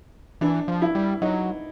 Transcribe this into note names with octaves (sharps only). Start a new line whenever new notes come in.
E3 D4
F3
E4
G3
F#3 D#4